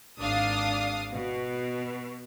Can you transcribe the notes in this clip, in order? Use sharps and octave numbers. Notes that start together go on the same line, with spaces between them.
G#1 D4 F5 D#6
B2